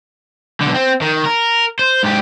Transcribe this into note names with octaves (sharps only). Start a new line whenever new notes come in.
B1 D3
C4
D#3
A#4
C5
G#2 G4